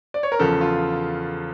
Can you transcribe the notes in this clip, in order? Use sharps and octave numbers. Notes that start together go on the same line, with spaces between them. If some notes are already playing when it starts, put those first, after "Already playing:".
D5
C#5
A#4
E2 C#3 F3 A4
F4